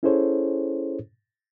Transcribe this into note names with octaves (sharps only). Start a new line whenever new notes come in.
C#4 E4 G#4 A4 C5 C#5